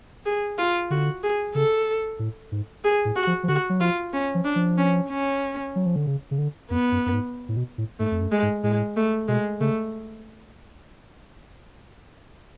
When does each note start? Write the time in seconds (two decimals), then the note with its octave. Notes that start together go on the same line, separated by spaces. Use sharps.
0.26 G#4
0.58 F4
0.90 D3 F#4
1.23 G#4
1.55 C#3 A4
2.19 A2
2.52 G#2
2.84 G#4
3.05 A2
3.16 F#4
3.27 F3
3.43 F3
3.48 D3 F#4
3.70 F#3
3.80 F3 F4
4.13 C#4
4.35 F3
4.45 D4
4.56 F3
4.77 C#4
5.09 C#4
5.76 F#3
5.86 F3
5.96 D3
6.07 C#3
6.31 C#3
6.38 D3
6.70 F2 B3
6.92 F#2
7.06 F#2
7.14 G#2
7.49 A2
7.57 B2
7.78 A2
8.00 G#2 A3
8.11 F2
8.21 F#2
8.32 G#3
8.42 G#2
8.63 A2 G#3
8.96 A3
9.28 B2 G#3
9.60 C#3 A3